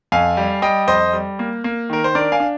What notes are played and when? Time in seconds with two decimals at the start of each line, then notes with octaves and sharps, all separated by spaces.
0.12 F2 F5 G#5
0.37 G3
0.62 G3 D#5 G5
0.87 F2 C5 D#5
1.13 G3
1.39 A#3
1.64 A#3
1.90 D#3 A#4
2.04 C5
2.15 D4 A#4 D5
2.32 F5 G#5
2.40 D4